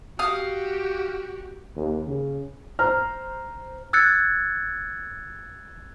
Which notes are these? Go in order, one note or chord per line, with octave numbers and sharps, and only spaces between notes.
F#4 G4 F5 D#6
D#2
C#3
C5 A#5 F6
E6 F#6 G#6 A6 C#7